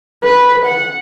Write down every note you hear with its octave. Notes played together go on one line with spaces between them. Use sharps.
B4
F#5